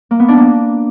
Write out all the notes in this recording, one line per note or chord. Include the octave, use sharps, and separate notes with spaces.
A#3
B3
D4
A#3